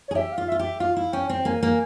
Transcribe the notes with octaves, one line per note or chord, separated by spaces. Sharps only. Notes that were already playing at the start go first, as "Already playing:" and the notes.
G#4 C#5
G4 E5
F5
F4
F4 E5
G4 E5
F4 F5
E4
C#4 G5
C4
A#3 G#5
A#3